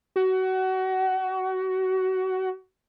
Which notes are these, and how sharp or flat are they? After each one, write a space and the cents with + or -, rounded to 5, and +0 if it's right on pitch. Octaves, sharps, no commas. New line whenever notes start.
F#4 +25